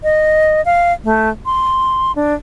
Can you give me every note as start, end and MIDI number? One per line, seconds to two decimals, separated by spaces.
0.03 0.64 75
0.65 0.93 77
1.04 1.29 57
1.46 2.12 84
2.16 2.34 62